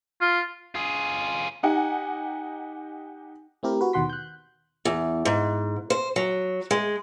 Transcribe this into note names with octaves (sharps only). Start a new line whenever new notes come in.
F4
F4 G#4
D#4 G4 F#5 G#5
A3 C4 E4 G4 A#4
F#4 B4
D#2 B2 D#3 F#5 C6 B6
F#6 G6
E2
G#2
C5
F#3
G#3